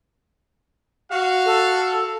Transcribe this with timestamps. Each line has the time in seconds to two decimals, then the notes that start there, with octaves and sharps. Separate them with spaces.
1.11 F#4 F5
1.45 A4